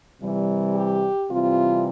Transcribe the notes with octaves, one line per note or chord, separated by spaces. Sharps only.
C3 E3 G3
G4
C3 E3 G3 C4 F4